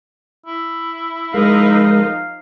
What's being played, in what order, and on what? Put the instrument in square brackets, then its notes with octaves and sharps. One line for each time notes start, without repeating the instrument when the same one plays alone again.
[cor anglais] E4
[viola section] F3 D#4 D#5 [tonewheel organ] G#3 A#4 [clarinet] F5